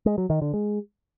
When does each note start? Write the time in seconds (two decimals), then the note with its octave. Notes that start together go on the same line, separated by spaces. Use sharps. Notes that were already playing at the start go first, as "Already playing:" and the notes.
0.06 G#3
0.18 F#3
0.30 D#3
0.42 D3
0.54 G#3